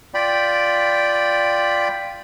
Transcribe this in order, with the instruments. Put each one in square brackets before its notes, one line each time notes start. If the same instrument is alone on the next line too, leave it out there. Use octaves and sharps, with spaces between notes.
[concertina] F4 D5 G5 B5